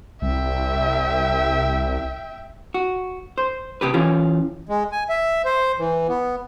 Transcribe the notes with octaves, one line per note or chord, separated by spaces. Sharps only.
C2 E5 G5
F#4
C5
C3 G4 B4
E3 C#4 F4
G#3
G#5
E5
C5
E3
B3